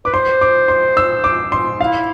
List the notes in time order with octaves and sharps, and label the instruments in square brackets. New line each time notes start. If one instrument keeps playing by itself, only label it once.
[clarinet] B4 [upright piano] D6
[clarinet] C5 [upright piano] C6
[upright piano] D6
C6
E6
D6
C6
[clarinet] E4 [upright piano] F5